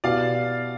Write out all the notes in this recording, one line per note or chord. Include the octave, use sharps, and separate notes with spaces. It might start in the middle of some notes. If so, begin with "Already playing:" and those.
B2 B3 E4 G4 D5 F5